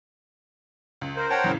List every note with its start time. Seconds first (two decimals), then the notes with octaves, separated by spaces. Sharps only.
1.01 C#2
1.16 A#4 C5
1.30 C#5 F#5 G5 A5
1.44 E2 A2 C#3